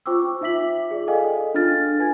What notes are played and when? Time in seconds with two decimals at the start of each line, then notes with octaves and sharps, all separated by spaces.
0.06 F4 C5 G5 C#6 D6 E6
0.41 D#4 F4 E5 D6 B6 F#7
0.91 G#4 D5
1.07 G#4 A4 D#5 F5 G5 G#5
1.54 D4 F4 A4 F6 A6
1.98 F4 B4 G#5 G#6